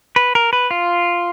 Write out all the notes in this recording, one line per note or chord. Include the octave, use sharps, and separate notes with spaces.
B4
A#4
B4
F4